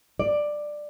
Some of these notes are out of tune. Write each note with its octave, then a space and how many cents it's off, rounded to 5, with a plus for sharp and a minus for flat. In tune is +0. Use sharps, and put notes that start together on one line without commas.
D5 +10